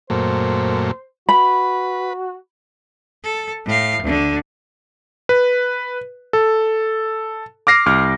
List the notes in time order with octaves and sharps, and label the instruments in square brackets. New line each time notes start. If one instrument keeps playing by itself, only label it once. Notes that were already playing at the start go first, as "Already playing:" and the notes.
[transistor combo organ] F#2 A#2 A3 [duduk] C5
[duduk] F#4 [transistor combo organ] B4 [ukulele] B5
[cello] A4
A2 F5
D2 D3
[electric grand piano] B4
A4
D6 F6 A#6 C7
C2 D6 F6